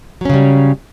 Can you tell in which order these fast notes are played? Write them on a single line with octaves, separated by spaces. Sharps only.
F#3 C#4 C#3 G3